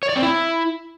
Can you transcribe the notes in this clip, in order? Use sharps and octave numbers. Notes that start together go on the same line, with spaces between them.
C#5
D5
C4
E4